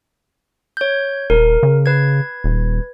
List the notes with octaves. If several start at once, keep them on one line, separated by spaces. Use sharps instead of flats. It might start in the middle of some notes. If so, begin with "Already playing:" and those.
C#5 G6
D#1 A#4
C#3
B4 G#6
D#1